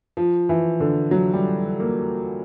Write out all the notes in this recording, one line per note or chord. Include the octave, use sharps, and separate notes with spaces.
F3
E3
D3
F#3
G3
A#3